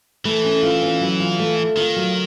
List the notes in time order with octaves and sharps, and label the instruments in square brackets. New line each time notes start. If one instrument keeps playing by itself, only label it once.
[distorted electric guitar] E3 [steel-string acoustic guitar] A3
[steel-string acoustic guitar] C#4
F4
C#4
F#3
F4
A3
F4
[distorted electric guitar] D#3 [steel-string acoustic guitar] F4
[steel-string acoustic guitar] F#3